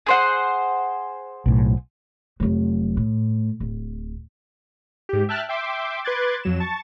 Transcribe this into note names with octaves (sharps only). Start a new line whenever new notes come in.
G#4 C5 F#5
B1 A2
F1 F#3
A2
D1
G#2 G4
E5 G5 A5 F6 F#6 A6
E5 G5 C6 D6
B4 C6 D6 F#6 G#6 A6
F2 F#3 E7
A5 C#6 A6